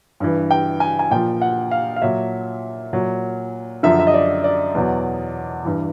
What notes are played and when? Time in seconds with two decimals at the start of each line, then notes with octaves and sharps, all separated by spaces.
0.20 G2 E3
0.51 G5
0.80 G#5
0.99 G#5
1.11 A#2 F3 G5
1.42 F#5
1.71 F5
1.96 F5
2.02 A#2 F#3 E5
2.93 A#2 F#3
3.83 F#2 D3 F3 E5
3.99 E5
4.07 D#5
4.14 D5
4.44 D5
4.75 E2 B2 F#3
5.65 G2 E3